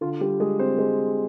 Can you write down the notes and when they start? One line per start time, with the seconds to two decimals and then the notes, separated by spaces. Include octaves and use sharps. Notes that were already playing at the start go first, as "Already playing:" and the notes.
0.01 D3 F4
0.21 G3 G4
0.40 G#3 G#4
0.59 C4 C5
0.78 G#3